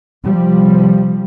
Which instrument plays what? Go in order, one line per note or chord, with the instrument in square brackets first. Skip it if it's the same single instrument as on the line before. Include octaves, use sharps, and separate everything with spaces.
[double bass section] C3 F3 G3